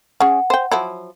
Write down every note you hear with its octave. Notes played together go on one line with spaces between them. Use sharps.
C#4 G#4 F#5
C5 G5
F3 F#3 E4